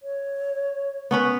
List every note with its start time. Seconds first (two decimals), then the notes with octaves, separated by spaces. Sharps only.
0.03 C#5
1.11 B3 C#4 B4